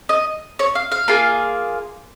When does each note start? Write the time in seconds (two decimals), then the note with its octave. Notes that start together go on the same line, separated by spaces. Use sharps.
0.09 D#5
0.59 C#5
0.75 F5
0.92 F5
1.08 A#3 F4 G#4